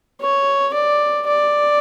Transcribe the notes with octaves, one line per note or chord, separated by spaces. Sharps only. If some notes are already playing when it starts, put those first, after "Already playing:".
C#5
D5
D5